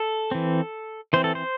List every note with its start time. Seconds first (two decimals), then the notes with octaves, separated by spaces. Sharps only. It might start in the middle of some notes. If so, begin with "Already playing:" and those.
Already playing: A4
0.31 E3 C4
1.13 E3 C4 C5
1.24 A4
1.35 C5